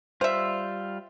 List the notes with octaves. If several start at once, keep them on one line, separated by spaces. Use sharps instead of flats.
G3 F4 C5 E5